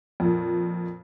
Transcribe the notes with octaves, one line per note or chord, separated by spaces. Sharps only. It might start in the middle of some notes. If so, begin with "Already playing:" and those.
F2 A#2